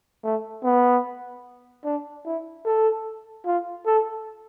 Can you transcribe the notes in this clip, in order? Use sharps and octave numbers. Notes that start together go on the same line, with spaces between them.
A3
B3
D4
E4
A4
F4
A4